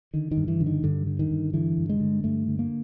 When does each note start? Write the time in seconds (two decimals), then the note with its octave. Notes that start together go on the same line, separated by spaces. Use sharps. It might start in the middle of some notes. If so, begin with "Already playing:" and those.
0.14 D3 D#3
0.31 D#3
0.37 G2
0.48 E3
0.60 D3
0.66 D#3
0.83 G2 D3
1.07 D3
1.19 D#3
1.31 G2
1.54 D3 E3
1.78 G2
1.89 G#3
2.00 D3
2.24 G2 A3
2.48 D3
2.59 A#3